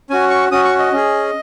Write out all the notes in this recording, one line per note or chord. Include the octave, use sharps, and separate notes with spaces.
C#4 F#4 G#5
C#6
C#4 F#4 D#6
C#6
D#5
C#4 G#4